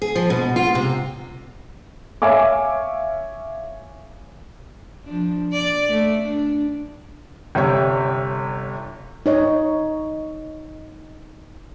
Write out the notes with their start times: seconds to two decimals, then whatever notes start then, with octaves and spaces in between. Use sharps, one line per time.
0.02 G#4
0.15 F3
0.30 B2
0.56 F4
0.75 C3
2.22 C#5 E5 F5 G#5 D6
5.05 F3 D4
5.53 D5
5.88 A3
6.23 D4
7.55 G1 C3 G3 C#5 C#6
9.26 D#4 C#5 D#5